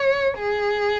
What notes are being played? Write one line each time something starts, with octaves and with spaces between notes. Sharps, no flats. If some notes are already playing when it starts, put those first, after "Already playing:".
Already playing: C#5
G#4